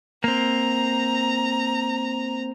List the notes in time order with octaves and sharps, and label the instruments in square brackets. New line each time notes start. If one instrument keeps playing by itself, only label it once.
[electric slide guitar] A#3 C4 [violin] A#5